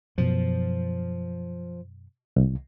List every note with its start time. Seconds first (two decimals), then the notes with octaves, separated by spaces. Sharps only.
0.18 F#2 B2 F3
2.36 C2